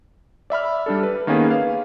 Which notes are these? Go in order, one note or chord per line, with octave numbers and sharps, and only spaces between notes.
D5 E5 B5 F6
G3 D4 A4
B4
D#3 A#3 B3 C#4 G#4 B4
F5